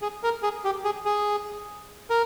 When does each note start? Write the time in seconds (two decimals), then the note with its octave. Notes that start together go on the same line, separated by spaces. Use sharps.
0.02 G#4
0.23 A#4
0.43 G#4
0.65 G4
0.84 G#4
1.05 G#4
2.10 A#4